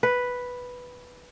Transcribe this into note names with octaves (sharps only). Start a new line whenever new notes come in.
B4